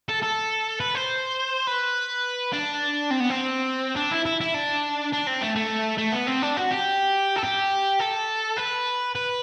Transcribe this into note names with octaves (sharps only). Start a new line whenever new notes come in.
A4
A4
B4
C5
B4
D4
C4
B3
C4
D4
E4
E4
E4
D4
D4
C4
A3
A3
A3
B3
C4
D4
F#4
G4
A4
G4
A4
B4
B4